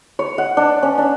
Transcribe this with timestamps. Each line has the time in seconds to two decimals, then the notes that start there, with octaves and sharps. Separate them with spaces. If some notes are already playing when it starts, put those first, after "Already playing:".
0.19 C#5
0.38 F#5
0.57 D4
0.83 C#4
0.98 D4